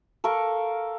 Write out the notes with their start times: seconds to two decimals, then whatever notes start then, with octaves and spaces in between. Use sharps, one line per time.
0.24 A4 A#4 F5 C#6